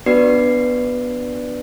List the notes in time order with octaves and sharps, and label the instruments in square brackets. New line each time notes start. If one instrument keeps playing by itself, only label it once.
[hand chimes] B3 D4 F#4 B4 D5 C7